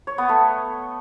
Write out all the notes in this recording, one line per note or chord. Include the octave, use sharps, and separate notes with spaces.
C#5
B3
A3